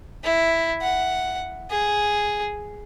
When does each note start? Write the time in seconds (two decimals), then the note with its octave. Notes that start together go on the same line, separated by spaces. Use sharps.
0.24 E4
0.82 F#5
1.71 G#4